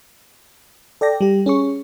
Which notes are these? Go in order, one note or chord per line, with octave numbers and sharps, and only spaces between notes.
A4 D5 G5 A#6
G3 G4
C#4 G#4 C#6